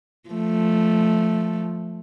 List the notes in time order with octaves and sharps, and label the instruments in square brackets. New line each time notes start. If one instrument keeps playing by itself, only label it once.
[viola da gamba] F3 A3